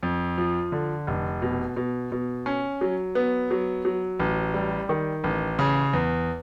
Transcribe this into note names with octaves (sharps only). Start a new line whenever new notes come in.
F2
F3
D3
F1
B2
B2
B2
C#4
F#3
B3
F#3
F#3
A1
G3
D#3
A1
C#3
E2